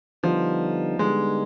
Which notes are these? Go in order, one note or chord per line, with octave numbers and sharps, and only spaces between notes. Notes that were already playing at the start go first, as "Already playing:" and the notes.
D3 F3 G3 B3 D#4
D3 G3 G#3 B3 D#4